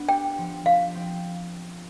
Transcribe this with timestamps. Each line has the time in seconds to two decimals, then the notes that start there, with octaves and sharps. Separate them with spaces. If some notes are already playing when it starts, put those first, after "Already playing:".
Already playing: B3 D4
0.08 G4 G5
0.38 F3
0.65 F3 F5
0.95 C4